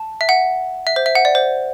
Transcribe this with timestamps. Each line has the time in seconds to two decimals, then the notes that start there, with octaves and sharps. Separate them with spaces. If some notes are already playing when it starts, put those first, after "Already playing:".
Already playing: A5
0.21 E5
0.29 F#5
0.87 E5
0.96 C5
1.06 E5
1.15 F#5
1.25 D5
1.35 C5